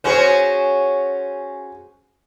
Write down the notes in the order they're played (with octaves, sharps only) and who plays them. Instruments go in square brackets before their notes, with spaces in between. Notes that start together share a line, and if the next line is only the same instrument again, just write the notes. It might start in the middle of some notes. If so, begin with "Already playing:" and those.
[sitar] C#4 F#4 G#4 [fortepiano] C5 C#5